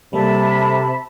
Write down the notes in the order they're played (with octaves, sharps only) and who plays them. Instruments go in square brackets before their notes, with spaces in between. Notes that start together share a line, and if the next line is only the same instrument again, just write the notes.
[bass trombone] C3 [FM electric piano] G3 A#3 A4 [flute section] E5 A5 B5